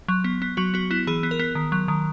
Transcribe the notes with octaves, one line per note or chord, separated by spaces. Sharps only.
F#3
B3
B3
F#3 F#4
B3 F#4
B3 E4
E3 G#4
B3
A#4
B3
D#3
F#3
D#3